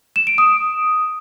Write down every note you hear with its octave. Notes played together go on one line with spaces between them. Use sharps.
E7
D7
D#6